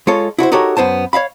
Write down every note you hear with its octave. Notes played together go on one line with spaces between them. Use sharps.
G#3 F4 A4 C#5
E4 F#4 B4 C5
D#4 F#4 G4 A4 A#4 C#5
F#2 B3 C5 A5
C#5 E5 F5 B5